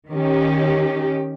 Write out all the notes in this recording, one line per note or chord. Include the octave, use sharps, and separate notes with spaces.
D#3 C#4 G4